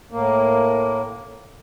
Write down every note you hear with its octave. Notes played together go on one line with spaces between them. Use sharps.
A2 A#3